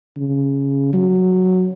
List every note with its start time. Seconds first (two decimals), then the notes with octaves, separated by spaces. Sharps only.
0.16 C#3
0.93 F#3